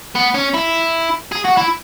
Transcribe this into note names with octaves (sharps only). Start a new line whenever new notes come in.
B3
C#4
E4
G#4
F#4
E4